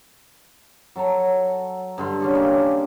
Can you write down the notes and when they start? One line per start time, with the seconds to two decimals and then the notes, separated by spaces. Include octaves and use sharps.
0.96 F#3 A4 A5 A#5
1.98 G2 D3 C6
2.20 C#4 D4 G#4 A4
2.35 A#3 G4